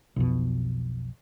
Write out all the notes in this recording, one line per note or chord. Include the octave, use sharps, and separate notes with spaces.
B1 F2 B2